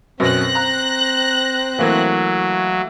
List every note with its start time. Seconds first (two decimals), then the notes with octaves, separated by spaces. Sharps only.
0.20 F#2 B2 C4 F#6 A#6
0.55 A#5
1.79 E3 F#3 A3 A#3